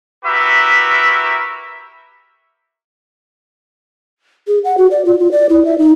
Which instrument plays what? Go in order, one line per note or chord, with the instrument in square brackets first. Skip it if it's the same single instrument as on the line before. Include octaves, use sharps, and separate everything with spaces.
[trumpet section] E4 F#4 G4 A#4 B4 E5
[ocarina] G#4
F#5
F#4
D5
F4
F4
D5
E4
E5
D#4